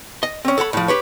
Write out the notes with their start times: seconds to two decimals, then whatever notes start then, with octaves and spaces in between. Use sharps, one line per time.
0.23 D#5
0.45 C4 C#4
0.58 A4 C#5 F#5 B5
0.73 A2 F3
0.88 G4 B4 C#5